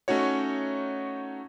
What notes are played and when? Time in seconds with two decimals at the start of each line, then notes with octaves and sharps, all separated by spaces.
0.08 A3 C#4 D#4 F#4 C#5